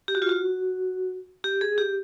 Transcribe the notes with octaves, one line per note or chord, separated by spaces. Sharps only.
G4
F#4
F4
F#4
G4
G#4
G4